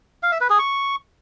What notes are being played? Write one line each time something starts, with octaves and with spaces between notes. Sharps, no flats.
F5
E5
B4
G#4
C#6